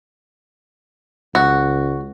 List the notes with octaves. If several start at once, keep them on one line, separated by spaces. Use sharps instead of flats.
C#2 F#4